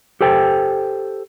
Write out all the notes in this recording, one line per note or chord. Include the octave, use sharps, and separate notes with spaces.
G4 A4 C5 G5